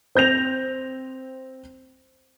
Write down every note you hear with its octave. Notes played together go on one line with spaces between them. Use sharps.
C4 G6 A#6 F7